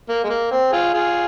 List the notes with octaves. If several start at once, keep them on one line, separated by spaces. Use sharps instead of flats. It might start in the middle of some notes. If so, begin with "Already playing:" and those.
A#3
G#3
A#3
C4
F4 G#4
F4 G#4